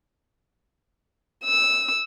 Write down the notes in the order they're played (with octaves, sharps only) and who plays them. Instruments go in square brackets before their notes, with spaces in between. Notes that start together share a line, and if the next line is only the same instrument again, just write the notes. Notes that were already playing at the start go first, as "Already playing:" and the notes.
[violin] E6